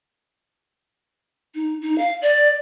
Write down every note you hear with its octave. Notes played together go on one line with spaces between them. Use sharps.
D#4
D#4
F5
D5